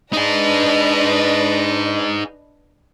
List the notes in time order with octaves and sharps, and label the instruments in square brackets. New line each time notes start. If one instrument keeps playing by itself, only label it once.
[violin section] D4 B4 D#5 [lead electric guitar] D#4 G#4